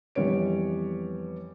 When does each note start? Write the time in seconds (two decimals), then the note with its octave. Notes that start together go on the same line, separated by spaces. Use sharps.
0.15 F2 E3 G3 B3 C#5 D7